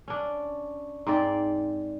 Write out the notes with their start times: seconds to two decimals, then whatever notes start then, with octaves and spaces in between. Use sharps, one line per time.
0.08 C#4 D4
1.07 G#2 C4 D5